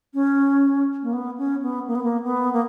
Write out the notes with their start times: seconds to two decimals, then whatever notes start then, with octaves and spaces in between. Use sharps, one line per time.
0.14 C#4
1.03 A#3
1.13 B3
1.38 C#4
1.62 B3
1.87 A#3
1.95 B3
2.03 A#3
2.24 B3
2.53 A#3